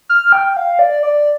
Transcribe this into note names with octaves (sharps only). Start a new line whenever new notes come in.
F6
G5
F5
D5
D5